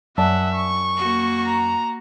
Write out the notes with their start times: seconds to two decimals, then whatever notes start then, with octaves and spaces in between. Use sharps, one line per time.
0.18 F#2 D5 E5 F#5 A5
0.55 C#6
0.96 A#3 F#4
1.45 A#5